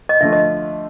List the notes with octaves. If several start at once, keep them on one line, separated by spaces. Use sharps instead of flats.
D#5
D3 F3 A3 E5
D#5